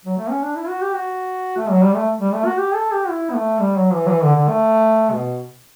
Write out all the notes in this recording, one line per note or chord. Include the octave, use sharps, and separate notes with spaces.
F#3
A3
C#4
D4
E4
F#4
G4
F#4
A3
F#3
G3
A3
G3
A3
F#4
G4
A4
G4
E4
B3
A3
G3
F#3
E3
F#3
E3
D3
D3
A3
B2